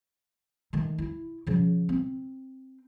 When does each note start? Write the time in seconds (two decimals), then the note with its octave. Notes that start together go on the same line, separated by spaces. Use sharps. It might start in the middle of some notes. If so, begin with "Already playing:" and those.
0.73 D#3 A3
0.98 E4
1.47 C#3 F3
1.89 C4